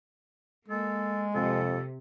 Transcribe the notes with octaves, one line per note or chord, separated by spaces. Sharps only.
G#3 A#3 A4
F2 C3 A4